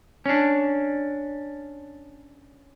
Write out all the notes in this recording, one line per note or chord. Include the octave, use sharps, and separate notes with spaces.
C#4 D4